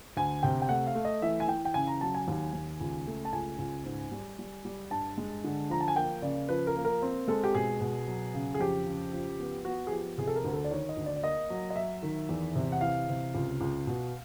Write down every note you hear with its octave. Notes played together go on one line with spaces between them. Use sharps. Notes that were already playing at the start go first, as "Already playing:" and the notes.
D2 G#5
C3 G5
G5
A3 F#5
F5
A3
D#5
E3 E5
G#5
E3 G5
G5
C#3 G#5
A#5
F#3 A5
G#5
D#2
D#2
C#2
A3
A5
C#2 G#5
C#2
G#2
G3
G3
G3
G2 A5
G#3
D3
F3 A#5
A5
G#5
A#3 G5
C#3 D5
F3 B4
A#4
A#3
A#4
C4
G#3 A4
G4
B2 G#4
B2
F#3
C#3
G#4
F2 G4
C#3
F3
B3
B3 F#4
G#4
F3 G4
C3 G#4
A4
A#4
D2
A4
D5
D#3 C#5
D#5
D2
D5
D5
A#3 D#5
F#3
D#5
F#3 E5
D#3
E2
C3
F#5
E3 F5
C3
C#2
C#2
B2